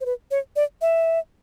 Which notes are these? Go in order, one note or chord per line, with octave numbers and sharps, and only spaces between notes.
C5
B4
C#5
D5
E5